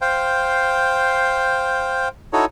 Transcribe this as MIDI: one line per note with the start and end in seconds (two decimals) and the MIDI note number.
0.01 2.08 72
0.01 2.08 77
0.01 2.08 79
2.33 2.45 63
2.33 2.45 64
2.33 2.45 66
2.33 2.45 69
2.33 2.45 73